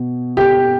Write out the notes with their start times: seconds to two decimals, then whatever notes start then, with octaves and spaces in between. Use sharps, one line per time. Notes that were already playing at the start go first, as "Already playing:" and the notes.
Already playing: B2
0.37 G4